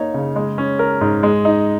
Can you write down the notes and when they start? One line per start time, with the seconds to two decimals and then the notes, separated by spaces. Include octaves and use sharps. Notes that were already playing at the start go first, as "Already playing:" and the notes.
Already playing: A#3 D#4 C#5
0.14 C#3
0.36 G#3
0.58 C#4
0.79 A#4
1.01 G#2
1.23 G#3
1.45 D#4